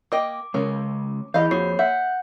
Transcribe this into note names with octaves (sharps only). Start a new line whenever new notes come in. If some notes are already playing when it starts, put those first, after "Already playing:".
A#3 D#5 G5 D6
C#3 G#3 C#4 A#4
E2 E3 G#4 D#5 F5 B5 G6
F2 A#3 F#4 C#5 C7
E5 F#5 G6